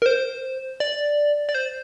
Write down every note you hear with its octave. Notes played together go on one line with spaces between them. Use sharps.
A#4
C5
D5
D5
C5